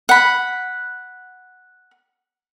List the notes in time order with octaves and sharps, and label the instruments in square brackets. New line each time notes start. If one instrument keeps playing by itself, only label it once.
[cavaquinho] F#5 B5